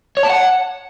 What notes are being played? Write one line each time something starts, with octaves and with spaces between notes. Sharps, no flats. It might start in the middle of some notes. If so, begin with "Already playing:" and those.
C#5
A5
F#5